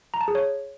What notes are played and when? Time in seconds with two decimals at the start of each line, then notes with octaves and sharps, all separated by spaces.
0.14 A#5
0.21 A5
0.28 G#4
0.35 C#5